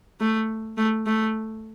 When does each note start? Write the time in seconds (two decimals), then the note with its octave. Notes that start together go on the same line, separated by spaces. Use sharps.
0.20 A3
0.78 A3
1.07 A3